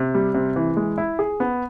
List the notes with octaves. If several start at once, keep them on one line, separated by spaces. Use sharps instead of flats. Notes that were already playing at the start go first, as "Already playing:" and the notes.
Already playing: C3
G3
C3
E3
G#3
E4
G#4
B3